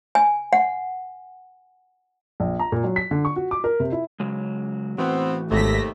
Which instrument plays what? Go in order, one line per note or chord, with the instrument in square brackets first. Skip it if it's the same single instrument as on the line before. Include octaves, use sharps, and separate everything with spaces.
[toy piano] G#5
F#5
[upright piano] A#1
A#5
A#2
F#3
B6
D3
C#6
F#4
D6
A#4
C3
E4
[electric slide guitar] C#3 F#3 G#3
[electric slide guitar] A2 E3 F#4 [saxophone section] B3 C4
[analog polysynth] G#1 A#6 B6 [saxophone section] D#2 C3 A3